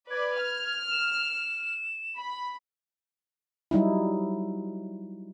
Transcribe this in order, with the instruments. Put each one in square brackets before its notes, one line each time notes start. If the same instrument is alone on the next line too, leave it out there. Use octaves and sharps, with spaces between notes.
[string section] B4 D5 [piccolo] G#6
[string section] F6
[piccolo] E7
[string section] B5
[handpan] F#3 G3 D#4 E4